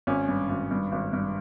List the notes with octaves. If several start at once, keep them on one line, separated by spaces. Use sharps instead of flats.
G#1 C#4
G2
G#1
G2
G#1
G2